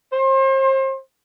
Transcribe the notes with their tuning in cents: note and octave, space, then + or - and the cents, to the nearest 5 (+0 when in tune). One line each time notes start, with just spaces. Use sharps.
C5 +35